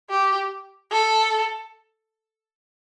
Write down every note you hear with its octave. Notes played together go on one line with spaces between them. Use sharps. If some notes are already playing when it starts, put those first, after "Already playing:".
G4
A4